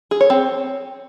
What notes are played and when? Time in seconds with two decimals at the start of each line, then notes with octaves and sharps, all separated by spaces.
0.11 G#4
0.21 C#5
0.30 C4